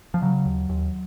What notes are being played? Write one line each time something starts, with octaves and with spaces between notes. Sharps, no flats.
F3
C#3 F#3
D#2
D#2